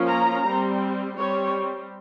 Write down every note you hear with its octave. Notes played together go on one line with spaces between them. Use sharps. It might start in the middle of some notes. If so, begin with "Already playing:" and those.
Already playing: F3 A#3 C#4
A#5
G3 C4
G3 C4 C#5